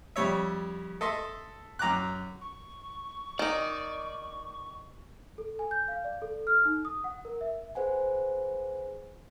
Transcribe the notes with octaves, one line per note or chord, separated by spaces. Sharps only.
F2 G3 C#5 E5
A4 D#5 E5 C6
F#2 A#5 D6 F#6
C#6
D#3 D#4 D5
A4
G#5
G6
F5
D5
A4
F6
D#4
D#6
F#5
A#4
E5
G#4 B4 C5 F#5 G#5